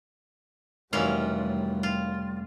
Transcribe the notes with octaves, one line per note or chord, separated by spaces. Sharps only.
F1 D#2 E3 F#3 G3 C#4 F4 D5
F4